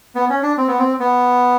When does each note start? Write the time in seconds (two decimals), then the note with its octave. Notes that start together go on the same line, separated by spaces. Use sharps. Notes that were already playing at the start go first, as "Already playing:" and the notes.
0.15 B3
0.29 C#4
0.43 D4
0.58 C4
0.68 B3
0.78 C4
1.00 B3